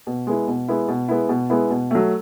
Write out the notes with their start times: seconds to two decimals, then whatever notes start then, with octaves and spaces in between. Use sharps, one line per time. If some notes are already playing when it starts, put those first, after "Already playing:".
0.07 B2
0.27 G#3 B3 E4
0.48 B2
0.68 G#3 B3 E4
0.88 B2
1.08 G#3 B3 E4
1.29 B2
1.50 G#3 B3 E4
1.70 B2
1.91 F#3 A3